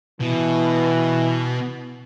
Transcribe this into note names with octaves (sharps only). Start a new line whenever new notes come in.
B2 E3